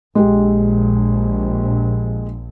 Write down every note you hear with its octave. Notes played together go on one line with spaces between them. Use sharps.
A#1 G#3 G4